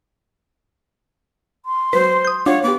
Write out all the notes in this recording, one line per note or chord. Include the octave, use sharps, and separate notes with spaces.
C6
F#3 B4 C5
D#6 G6
D4 F4 C#5 F5 F#5
B3 G4 D6